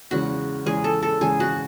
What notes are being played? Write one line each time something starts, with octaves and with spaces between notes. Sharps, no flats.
E2 C#3 G#3 F#4
E2 C#3 G#3 G#4
A4
A4
E2 C#3 G#3 G#4
F#4